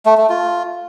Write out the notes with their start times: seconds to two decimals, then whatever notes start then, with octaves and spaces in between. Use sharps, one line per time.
0.06 A3
0.18 A3
0.29 F4